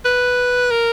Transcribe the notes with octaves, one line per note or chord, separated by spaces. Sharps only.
B4
A#4